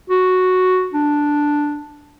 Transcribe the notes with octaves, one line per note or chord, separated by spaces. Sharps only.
F#4
D4